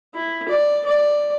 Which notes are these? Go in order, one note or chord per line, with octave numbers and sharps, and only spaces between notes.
E4
D5
D5